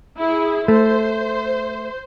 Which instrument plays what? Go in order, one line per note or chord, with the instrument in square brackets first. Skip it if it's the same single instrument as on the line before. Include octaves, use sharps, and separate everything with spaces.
[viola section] E4 G#4
[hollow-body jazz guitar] A3 [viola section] C5